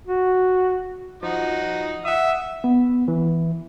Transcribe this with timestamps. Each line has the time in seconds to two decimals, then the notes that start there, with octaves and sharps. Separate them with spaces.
0.07 F#4
1.23 F3 D#4 F#4 D#6
2.05 E5 F#5 D#6
2.64 B3
3.08 E3